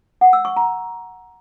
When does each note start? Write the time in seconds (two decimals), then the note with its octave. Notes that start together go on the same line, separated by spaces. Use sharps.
0.21 F#5
0.33 E6
0.45 C#6
0.57 A#5